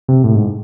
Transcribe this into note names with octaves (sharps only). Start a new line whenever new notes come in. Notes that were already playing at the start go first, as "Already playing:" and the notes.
C3
A2
G#2